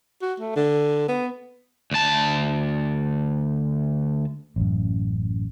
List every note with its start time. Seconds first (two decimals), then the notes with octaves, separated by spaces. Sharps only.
0.21 F#4
0.40 A3
0.56 D3
1.08 B3
1.91 D2 A5
4.56 A1 F#2